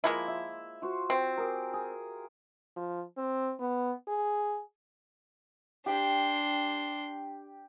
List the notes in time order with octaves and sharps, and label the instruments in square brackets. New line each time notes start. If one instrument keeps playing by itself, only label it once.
[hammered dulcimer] F3 [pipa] G#3 A#3 E4
[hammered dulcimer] E5
F4 F#4 C5
[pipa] C4
[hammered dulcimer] G4 G#4 A#4
G#4
[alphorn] F3
C4
B3
G#4
[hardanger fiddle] D4 C6 [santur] G4 G5